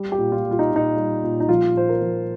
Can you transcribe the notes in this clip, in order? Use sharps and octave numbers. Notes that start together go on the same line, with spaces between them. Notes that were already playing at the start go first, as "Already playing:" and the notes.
Already playing: G3
G4
A#2
F4
G3
F4
D#4
A#2 D#4
G3
A#2
D#4
F3 F4
A#2 C5
A#4
F3